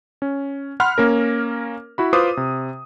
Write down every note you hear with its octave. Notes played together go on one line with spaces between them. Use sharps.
C#4
F#5 B5 C6 F6
A#3 C#4 A#4
E4 F#4 B5
F4 B4 C5 D6 D#6
C3